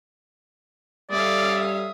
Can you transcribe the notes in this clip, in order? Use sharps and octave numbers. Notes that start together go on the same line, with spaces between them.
G3 C#4 A4 D5 E5 F5 D#6